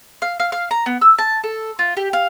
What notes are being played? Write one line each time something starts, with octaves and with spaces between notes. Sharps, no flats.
F5
F5
F5
A#5
B3
E6
A5
A4
F4
G4
F5